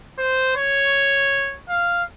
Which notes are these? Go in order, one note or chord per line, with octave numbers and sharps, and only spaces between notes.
C5
C#5
F5